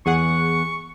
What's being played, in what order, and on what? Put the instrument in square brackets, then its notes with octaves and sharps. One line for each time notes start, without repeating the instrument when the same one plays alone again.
[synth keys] E2 G#4 F#5 [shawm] C#6